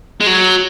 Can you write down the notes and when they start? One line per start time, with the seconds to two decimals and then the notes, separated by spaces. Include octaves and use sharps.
0.21 G#3
0.27 F#3